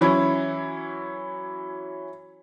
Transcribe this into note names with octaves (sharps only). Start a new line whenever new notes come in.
E3 F#3 C#4 E4